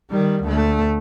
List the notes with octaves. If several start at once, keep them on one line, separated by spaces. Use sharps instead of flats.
D#3 G3
D2 A3